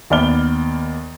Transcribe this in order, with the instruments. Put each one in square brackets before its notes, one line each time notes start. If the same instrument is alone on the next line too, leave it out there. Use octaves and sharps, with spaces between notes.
[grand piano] D#2 B3 D5 F6 G7